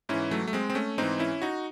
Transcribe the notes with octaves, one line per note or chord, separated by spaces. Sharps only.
G#2 E3 C#4 E4
F#3 A3
A3
G#3 C4
C4
A3 C#4
G#2 E3 C4 D#4
C#4 E4
D#4 F#4